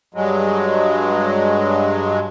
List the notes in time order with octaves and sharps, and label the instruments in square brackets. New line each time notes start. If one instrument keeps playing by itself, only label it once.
[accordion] G2 F#3 G#3